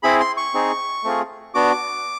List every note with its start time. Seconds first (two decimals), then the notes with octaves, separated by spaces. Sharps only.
0.03 C4 E4 G#4 B5
0.20 C6
0.37 C#6
0.54 C4 D#4 G#4
1.04 A3 C4 F4 G#4
1.54 B3 D4 F#4 D6